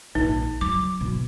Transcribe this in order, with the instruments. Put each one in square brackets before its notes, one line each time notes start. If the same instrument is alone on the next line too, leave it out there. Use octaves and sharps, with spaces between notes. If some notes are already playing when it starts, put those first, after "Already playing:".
[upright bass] A#1 [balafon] D#4
[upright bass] F#3 [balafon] D6
[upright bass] B2